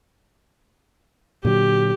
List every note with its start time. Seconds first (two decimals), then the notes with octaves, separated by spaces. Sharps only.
1.45 A#2 D3 F#3 G4